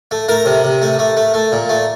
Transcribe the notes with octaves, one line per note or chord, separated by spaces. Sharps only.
A3
A3 A#4
C3
C3
A3
A3
A3
A3
A#2
A3